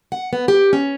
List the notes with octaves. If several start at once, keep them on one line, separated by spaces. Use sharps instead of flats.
F#5
B3
G4
C#4